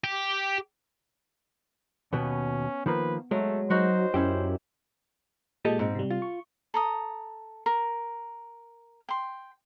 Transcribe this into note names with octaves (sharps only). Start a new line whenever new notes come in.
G4
D#2 B2 B3 C#4
D#3 F3 A#3 B4
F#3 G#3 A3
F#3 D#4 F#4 C5 F#5
F#2 C#4 E4 G4
A#2 G#3 G4 A4 D#5
G#2 C4
C3 G3
F4
C#6
A4 A#5 D#6
A#4
G5 C6